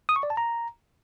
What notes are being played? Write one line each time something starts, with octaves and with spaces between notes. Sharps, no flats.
D#6
C#6
D5
A5
A#5